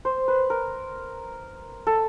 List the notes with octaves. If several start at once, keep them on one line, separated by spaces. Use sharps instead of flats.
C5
B4
A#4
A4